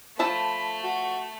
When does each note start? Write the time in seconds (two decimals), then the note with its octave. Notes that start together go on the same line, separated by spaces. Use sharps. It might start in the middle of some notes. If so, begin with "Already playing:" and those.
0.19 F3 A3 A4 A5 B5
0.83 F#4